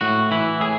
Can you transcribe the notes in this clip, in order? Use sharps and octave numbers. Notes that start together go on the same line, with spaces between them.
A2 F#4
E3 E4
A2 G#4